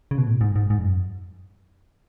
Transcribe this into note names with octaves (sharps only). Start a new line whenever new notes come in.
C#3
B2
A2
G#2
G#2
G#2
F2
F#2